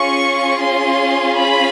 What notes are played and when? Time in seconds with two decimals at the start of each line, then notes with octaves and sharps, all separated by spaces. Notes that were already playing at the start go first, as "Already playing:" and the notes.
Already playing: C#4 F4 G#4 C#6
0.63 C6
1.38 B5